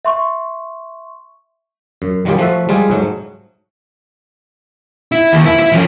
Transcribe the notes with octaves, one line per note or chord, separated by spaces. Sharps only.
E5 C6 C#6
F#2
D#3 F#3 G3 F4 G4 G#4
F3 A3 F#4 E5
G3 G#3 F4 G4 G#4
G#2 F#3 A3
E4
D#2
E4
E4
F3 C#4